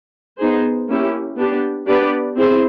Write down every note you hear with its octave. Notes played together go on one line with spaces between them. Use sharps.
B3 D#4 G#4 C5
A#3 C#4 E4 G4
B3 D4 G4
B3 D4 G4 B4 D5
C4 E4 G#4 C5